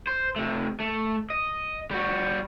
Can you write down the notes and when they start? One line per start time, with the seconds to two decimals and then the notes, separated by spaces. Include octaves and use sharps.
0.07 C5
0.36 C3 A3
0.80 A3
1.30 D#5
1.91 G3 F#4